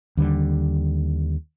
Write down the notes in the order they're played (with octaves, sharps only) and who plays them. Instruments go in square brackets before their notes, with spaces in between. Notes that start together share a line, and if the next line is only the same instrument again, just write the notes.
[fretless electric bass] D#2 D3 G3